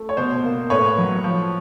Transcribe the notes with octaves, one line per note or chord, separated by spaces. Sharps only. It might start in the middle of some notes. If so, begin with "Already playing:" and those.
Already playing: A3
C#5
B2 C5
A#3
A2 B4 C#5
F#3
F3